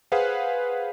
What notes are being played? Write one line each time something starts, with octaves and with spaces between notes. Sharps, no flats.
G#4 B4 C5 F5 F#5